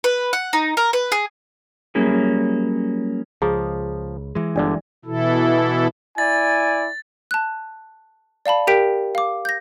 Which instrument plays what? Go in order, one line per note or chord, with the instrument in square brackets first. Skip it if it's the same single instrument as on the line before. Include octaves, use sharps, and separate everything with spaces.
[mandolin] B4
F#5
D#4
A#4
B4
G#4
[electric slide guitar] F#3 G3 A#3 C#4 E4 G#4
[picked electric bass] C#2 [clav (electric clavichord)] F3 [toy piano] G#4 A#5
[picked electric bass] E3 G#3
[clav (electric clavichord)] G1 D3 [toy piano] D4 D5
[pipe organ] B2 E3 E4 A4
[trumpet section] E4 D5 G#5 [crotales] A6
[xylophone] A5 F#6
D5 F5 A5 B5
G4 A#4 G5 G6 B6 D7
F5 D6
G6 A#6